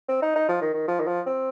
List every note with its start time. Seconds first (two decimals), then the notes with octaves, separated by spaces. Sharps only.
0.08 C4
0.22 D#4
0.35 D#4
0.49 F3
0.61 D#3
0.74 D#3
0.88 F3
1.00 D#3
1.07 F3
1.27 C4